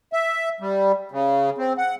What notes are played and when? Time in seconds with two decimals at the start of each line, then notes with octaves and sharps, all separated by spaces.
0.13 E5
0.60 G3
1.11 C#3
1.58 C4
1.78 F#5